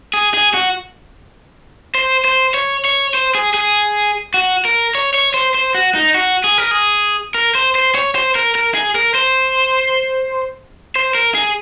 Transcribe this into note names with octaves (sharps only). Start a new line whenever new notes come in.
G#4
G#4
F#4
C5
C5
C#5
C#5
C5
G#4
G#4
F#4
A#4
C#5
C#5
C5
C5
F#4
D#4
F#4
G#4
A#4
G#4
A#4
C5
C5
C#5
C5
A#4
A#4
G#4
A#4
C5
C5
A#4
G#4